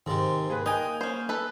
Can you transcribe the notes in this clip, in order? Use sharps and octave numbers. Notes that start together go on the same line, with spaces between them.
G#2 C3 D#3
A#3 G#4 B4
D#4 G5 G#5 D#6
C#4 C5
A4 B4